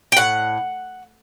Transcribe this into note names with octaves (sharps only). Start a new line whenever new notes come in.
G5
A2 F#5